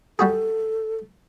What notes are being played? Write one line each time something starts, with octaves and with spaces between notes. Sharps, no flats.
G3 F#4 G#4 A4